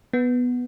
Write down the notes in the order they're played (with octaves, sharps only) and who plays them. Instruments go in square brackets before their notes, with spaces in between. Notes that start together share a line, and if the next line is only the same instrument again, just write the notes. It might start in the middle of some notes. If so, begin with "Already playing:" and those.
[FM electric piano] B3